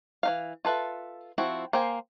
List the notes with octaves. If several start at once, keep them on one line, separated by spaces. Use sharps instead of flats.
E3 D#4 F5
F4 A4 B4 E5
F3 C4 E4 F#4
A#3 C5 G5 G#5